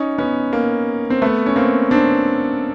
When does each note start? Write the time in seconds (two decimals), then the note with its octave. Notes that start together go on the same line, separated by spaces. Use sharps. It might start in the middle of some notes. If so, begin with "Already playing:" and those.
Already playing: C#4 D#4
0.18 B3 C#4
0.53 A#3
1.10 C4
1.22 A3 B3
1.46 C#4
1.56 A#3 C4
1.91 C4 D4